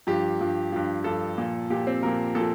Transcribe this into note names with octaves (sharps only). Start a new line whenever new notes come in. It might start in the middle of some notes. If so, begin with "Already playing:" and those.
G2 F3 G4
G2 F3
G2 F3
G2 F3 A4
A#2 F3
A#2 F3 G4
C4
A#2 F3 A#4
A#2 F3 A4